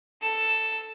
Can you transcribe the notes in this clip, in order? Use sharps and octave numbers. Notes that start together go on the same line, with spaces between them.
A4 E6